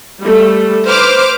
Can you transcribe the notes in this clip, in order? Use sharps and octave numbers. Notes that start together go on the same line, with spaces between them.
G3 A3
B4 C5 D6 F6